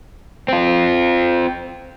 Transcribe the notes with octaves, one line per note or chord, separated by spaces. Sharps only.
C4 F4